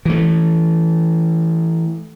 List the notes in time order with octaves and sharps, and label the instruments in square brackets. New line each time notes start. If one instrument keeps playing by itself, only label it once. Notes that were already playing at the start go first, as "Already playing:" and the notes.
[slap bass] E3 A3